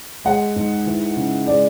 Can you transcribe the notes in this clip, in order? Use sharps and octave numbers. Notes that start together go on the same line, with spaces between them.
G#3 F#5
G#2
E3
C#3
G#3 D5